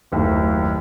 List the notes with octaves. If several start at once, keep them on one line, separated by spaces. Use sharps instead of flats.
F#1 D#2 A3